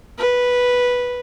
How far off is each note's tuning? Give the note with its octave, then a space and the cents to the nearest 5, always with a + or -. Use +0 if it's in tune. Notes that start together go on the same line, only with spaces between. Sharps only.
B4 -5